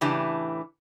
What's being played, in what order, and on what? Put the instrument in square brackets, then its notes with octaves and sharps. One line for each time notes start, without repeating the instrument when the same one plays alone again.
[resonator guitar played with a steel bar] A2 C#3 E3 D4 G4